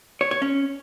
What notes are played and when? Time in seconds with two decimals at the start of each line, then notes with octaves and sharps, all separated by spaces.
0.21 C#5
0.31 C#5
0.42 C#4